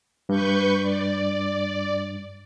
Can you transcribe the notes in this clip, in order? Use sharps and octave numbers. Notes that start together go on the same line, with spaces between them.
G2 B4 C#6 G6
D5